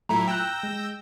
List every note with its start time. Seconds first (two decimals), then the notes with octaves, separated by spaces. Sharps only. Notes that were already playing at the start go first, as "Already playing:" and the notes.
0.09 A2 F#3 A3 E4 F4 A#5
0.28 G5 A#5 E6 F#6 G6 A#6
0.63 G#3